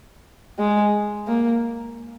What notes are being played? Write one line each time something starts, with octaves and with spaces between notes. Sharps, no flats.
G#3
A#3